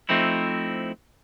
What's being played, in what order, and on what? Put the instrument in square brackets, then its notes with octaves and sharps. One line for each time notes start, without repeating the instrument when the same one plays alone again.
[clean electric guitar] F3 A3 C4 D#4 E4